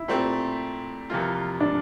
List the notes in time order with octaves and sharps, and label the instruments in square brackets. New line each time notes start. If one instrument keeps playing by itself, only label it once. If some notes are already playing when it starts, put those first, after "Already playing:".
Already playing: [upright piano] E4
[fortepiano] A#2 A3 C4 G4
F2 C3 E3 A#3 F4
[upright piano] D4